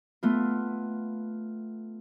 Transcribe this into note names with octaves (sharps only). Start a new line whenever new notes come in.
A3 B3 F4